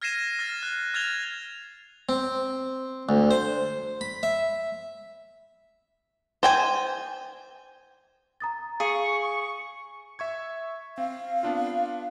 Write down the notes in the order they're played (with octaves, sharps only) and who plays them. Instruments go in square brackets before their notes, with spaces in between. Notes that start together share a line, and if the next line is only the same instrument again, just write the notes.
[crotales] F6 G#6 A#6 C7 D#7 E7
F6 A6
F#6
F6 G#6 A6 F7 G7
[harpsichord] C4
D2
C5
B5
E5
[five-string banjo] C5 G5 G#5
[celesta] A#5 D#6 A6
[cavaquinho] G#4 [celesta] F5 [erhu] C#6
[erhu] C#6
[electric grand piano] E5 C#6 G#6
[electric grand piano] C4 [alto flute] F5
[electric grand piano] B3 D4 F4